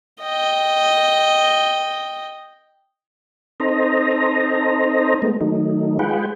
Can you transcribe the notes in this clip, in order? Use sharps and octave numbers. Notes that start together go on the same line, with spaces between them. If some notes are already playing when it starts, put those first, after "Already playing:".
D#5 G5
C4 D#4 A4 C5 D#5 A#5
G#3 A3 B3
D#3 F#3 A3 D#4
G#3 F4 G#4 B4 F#5 G5